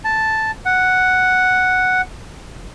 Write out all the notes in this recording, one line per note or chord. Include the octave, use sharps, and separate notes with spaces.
A5
F#5